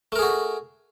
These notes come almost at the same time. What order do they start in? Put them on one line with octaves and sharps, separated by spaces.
A3 A#4 G#4 F#4